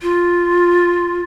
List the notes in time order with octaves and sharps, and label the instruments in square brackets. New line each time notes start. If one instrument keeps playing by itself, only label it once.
[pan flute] F4